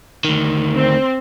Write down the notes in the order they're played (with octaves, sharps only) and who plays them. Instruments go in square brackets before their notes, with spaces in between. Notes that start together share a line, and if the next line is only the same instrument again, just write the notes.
[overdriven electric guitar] D2 D#3
[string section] C4